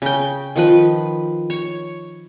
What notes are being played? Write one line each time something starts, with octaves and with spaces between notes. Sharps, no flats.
C#3 G5
D#3 F3 B4
C#5